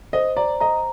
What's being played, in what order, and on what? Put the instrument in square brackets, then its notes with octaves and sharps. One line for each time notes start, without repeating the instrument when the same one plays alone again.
[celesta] C5 [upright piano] D#5
[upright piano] D5 [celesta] A#5
[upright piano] D#5 [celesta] A#5